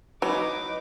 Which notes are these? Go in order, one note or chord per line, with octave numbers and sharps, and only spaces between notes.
E3 F#3 D#4 B4 D6